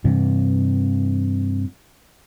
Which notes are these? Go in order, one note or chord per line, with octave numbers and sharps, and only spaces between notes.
G2 C3 E3